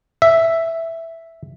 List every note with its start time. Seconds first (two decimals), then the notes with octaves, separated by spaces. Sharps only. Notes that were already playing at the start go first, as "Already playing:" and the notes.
0.22 E5